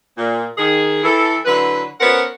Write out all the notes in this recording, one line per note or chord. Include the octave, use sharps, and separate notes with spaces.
A#2
D#3 G#4
E3 A4
D3 F#3 E4 B4
B3 C#4 A#4 C5 F#5